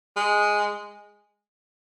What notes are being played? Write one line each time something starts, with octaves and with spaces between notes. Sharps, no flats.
G#3